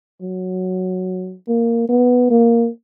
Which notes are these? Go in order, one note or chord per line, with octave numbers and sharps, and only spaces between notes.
F#3
A#3
B3
A#3